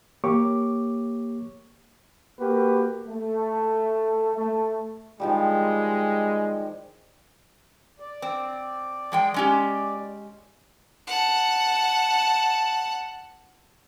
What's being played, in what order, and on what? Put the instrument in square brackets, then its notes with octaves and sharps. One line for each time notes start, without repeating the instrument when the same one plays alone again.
[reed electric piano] A#3 G4 C#5 C#6 D6
[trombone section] A#3 F#4 G4 B4
A3
A3
[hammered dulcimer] D#3 F3 G3 [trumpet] G#3
[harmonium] D5
[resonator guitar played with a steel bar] C4
F3 G#3 G5
G#3 C#4 G4
[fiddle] F#5 A5